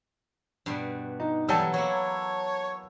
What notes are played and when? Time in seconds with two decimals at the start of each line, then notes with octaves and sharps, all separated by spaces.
0.66 G2 B2 G3
1.20 D#4
1.48 E3 F#3 G3 A4 A5 E6
1.74 F#3 A#3 E4 C#5